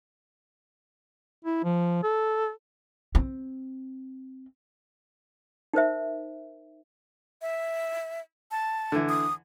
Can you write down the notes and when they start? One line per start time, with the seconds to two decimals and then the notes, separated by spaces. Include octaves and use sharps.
1.45 E4
1.64 F3
2.03 A4
3.15 C4
5.73 D#4 A#4 C5 E5
7.42 E5
8.51 A5
8.92 D3 E3
9.09 D#6